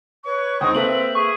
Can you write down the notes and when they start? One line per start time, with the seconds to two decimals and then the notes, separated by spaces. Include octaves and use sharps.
0.24 B4 C#5 C#6
0.61 C#2 C4 D#4 G5 C#6 D#6
0.75 A#3 A4 B4 E5 F#7
1.15 G#4 C#6